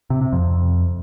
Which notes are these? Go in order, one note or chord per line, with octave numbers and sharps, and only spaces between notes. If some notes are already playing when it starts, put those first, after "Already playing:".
C3
C3
F2